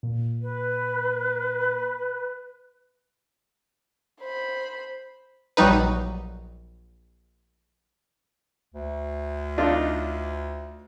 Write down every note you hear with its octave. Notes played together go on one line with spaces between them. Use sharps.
A#2
B4
C5 B5
A#1 F#3 G3 D#4 B4
D2
D4 D#4 F4